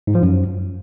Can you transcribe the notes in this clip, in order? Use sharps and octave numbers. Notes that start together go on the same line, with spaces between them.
G#2
F3
F#2